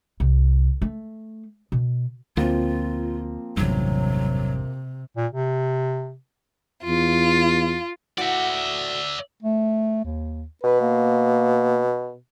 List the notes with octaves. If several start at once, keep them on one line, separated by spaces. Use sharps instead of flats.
C2
A3
B2
D2 F3 A#3 C4 F4
A1 E2 G2 C3 F#3
A#2
C3
E2 F4
A2 F#4 D5 E5
A3
D#2
B2 B4
A#3